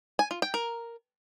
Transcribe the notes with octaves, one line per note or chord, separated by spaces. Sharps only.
G#5
F4
G5
A#4